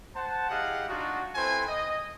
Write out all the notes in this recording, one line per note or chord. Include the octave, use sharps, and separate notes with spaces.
C5 F#5 A5
E4 G4 G#4 D#5 F5 F#5
D4 D#4 F4 F#4
C4 E4 A4 B4 C5 G#5
D#5